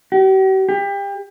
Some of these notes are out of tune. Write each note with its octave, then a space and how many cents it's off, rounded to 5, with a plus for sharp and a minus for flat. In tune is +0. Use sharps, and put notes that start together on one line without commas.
G4 -45
G4 +30